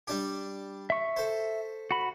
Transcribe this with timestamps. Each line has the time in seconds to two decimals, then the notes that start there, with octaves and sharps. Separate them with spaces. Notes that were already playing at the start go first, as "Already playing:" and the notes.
0.07 G3 D4 G4
0.90 E5 C#6
1.17 A4 C5
1.91 F#4 B5